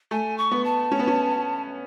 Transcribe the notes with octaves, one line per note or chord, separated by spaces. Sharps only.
A3 G#5
C#6
B3
A5
C#4
B3
C#4